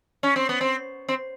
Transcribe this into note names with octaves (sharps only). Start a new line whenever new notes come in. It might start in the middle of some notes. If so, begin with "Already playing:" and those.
C#4
C4
B3
C4
C4